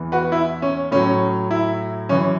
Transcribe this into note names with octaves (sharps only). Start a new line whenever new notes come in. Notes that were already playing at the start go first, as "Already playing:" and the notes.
Already playing: E2 E3
F#4 B4
E4
C#4
A2 F#3 C#4
E4
F#2 E3 C#4